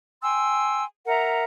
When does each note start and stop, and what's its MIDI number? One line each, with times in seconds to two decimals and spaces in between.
0.22 0.83 79
0.22 0.83 80
0.22 0.83 84
0.22 0.83 88
1.07 1.44 70
1.07 1.44 76
1.07 1.44 78
1.07 1.44 82